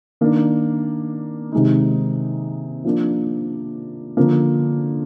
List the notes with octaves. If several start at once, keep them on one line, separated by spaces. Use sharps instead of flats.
D#3 A#3 D4
C3 D#3 G#3 D#4
F3 A#3 D4
D3 F3 A#3